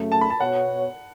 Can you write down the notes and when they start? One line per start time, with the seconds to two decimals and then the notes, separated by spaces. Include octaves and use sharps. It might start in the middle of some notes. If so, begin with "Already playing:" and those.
Already playing: F#2 C#3 A3
0.12 A5
0.21 B5
0.30 A5
0.40 B2 B3 F#4 C#5 F#5